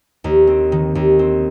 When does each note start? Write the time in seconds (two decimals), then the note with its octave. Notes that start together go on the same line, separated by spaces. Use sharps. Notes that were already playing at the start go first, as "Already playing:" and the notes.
0.24 D#2
0.47 C4
0.72 D#3
0.95 D#2
1.19 C4